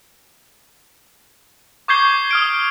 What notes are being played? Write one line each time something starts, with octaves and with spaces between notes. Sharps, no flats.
C#6 D6 G6 G#6 C7 G7
D#6 F6 D7